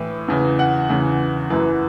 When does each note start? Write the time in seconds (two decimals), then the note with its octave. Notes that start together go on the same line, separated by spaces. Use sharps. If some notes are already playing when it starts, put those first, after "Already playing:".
Already playing: A2 E3
0.28 E2 C#3 E3
0.59 F#5
0.89 E2 C#3 E3
1.50 F#2 E3